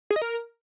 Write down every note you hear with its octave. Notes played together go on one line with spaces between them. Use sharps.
G#4
D#5
A#4